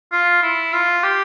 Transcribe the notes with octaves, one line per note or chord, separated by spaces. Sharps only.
F4
E4
F4
G4